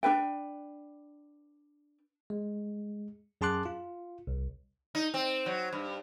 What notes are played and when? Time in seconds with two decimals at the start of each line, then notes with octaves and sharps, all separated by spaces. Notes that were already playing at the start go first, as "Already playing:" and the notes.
0.03 D4 A#4 B4 G5
2.30 G#3
3.41 F#2 G#4 A5 C6 D6 F#6
3.66 F4
4.27 C2
4.95 D#4
5.14 C4
5.46 F#3
5.73 G2